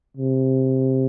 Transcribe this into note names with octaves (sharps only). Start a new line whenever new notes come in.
C3